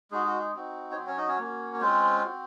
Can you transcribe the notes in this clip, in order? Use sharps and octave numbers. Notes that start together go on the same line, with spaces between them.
G#3 D#4 F#4 G#4
F#4
G#4
C4 D#4 F#4
C#5
F#3 C4 F#4 C5
C#4 C#5
D#4 D#5
C#4 C#5
A#3 C#4 F#4
C#5
G#3 C4 C#4 F4 C5
C4 F#4